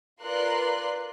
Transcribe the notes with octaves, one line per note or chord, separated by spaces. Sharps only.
F4 A#4 B4 D5 C6 F#6